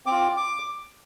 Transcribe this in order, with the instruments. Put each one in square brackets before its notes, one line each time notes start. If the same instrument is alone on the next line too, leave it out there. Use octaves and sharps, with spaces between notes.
[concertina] C4 D6
F4
D6